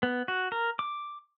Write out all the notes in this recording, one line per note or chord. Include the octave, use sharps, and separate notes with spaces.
B3
F#4
A#4
D6